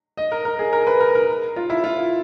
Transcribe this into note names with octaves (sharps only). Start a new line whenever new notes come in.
D#5
A#4
A#4
G#4
A#4
B4
A#4
A#4
F4
E4
F4